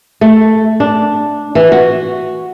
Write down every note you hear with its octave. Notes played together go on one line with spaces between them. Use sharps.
A3
D4
E3
F#4